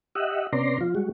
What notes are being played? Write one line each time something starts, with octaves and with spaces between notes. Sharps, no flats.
G4 D#5 E5 F#5
C3 B3 C#4 D5 A#5 C6
F3 F4
G3 G#3 F#4